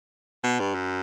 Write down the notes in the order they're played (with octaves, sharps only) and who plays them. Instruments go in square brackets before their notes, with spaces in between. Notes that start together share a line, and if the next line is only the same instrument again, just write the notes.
[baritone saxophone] B2
G2
F#2